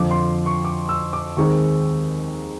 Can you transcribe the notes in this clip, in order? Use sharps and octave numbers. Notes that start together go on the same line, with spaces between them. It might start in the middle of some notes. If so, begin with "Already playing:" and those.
Already playing: F2 D3 F3 D6
C6
C#6
D6
E6
D6
D#2 D#3 G#3 C4 D#4 C#6